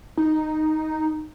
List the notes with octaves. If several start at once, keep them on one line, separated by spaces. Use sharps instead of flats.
D#4